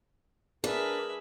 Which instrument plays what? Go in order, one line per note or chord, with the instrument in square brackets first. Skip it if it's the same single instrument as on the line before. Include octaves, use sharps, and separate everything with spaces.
[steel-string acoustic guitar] D4 [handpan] G#4 [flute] A#4 [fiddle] B4 E5